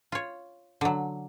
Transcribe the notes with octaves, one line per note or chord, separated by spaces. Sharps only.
F4 C#5
D3 F#3